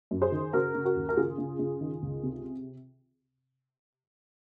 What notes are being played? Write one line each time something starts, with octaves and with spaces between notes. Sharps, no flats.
F#2
G#4 C5
D#3
C#3 F#4 A#4
C#3
F#4 A#4
D#2
A#4
C#3 F4 G#4
C#3
C#3
D#3
C#2
C3